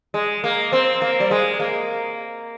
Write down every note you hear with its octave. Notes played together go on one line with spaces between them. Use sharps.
G#3
A#3
C4
A#3
G3
G#3
A#3